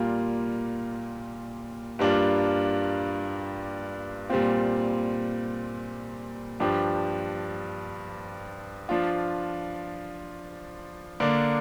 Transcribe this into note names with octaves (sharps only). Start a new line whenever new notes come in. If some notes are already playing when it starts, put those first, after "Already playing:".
Already playing: A#2 G3 A#3 F4
G2 G3 A#3 D4 F4
A#2 G3 C4 F4
G2 F3 D4 G4
F3 D4 F4
D3 A#3 D4